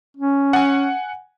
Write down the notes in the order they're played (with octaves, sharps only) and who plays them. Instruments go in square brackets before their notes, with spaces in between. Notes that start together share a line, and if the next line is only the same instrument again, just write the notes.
[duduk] C#4
[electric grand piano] F#5 G#5